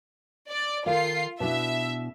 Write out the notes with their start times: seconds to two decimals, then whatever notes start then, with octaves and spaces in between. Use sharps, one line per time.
0.50 D5
0.86 D#3 F4 A4 F5 C7
1.40 B2 D4 E4 E5